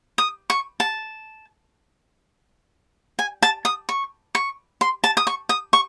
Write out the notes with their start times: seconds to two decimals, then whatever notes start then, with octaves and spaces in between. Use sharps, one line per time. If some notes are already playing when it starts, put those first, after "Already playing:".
0.18 D#6
0.50 C#6
0.80 A5
3.19 G#5
3.42 A5
3.65 D#6
3.89 C#6
4.35 C#6
4.81 C6
5.04 A5
5.17 D#6
5.27 C#6
5.49 D#6
5.73 C#6